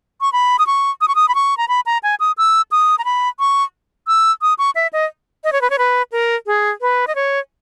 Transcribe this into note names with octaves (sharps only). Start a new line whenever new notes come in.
C#6
B5
D#6
C#6
D#6
C#6
D#6
B5
C#6
A#5
B5
A#5
G#5
D#6
E6
D#6
A#5
B5
C#6
E6
D#6
C#6
E5
D#5
D#5
C#5
B4
C#5
B4
A#4
G#4
B4
D#5
C#5